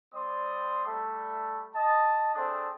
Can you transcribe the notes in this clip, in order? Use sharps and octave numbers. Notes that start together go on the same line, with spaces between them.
G3 C4 D5 C6 D#6
G3 A3
D#5 A5
A3 C4 D4 G#4 A4